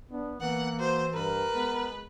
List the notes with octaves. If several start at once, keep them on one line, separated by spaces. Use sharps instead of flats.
B3 D4
E3 A#3 B3 F#5
F#4 C5
G2 A#4 B4
G#3 B3